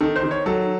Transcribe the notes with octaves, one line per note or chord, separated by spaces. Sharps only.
D#3 A4
C5
D#3
C#5
F#3 A4